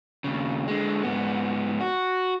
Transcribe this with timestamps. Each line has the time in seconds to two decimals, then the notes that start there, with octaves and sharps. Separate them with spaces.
0.24 D#2 C#3
0.67 D3 G#3
1.03 G#2 B3
1.81 F#4